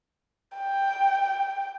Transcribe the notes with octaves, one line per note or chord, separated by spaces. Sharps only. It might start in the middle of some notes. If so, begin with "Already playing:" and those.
G5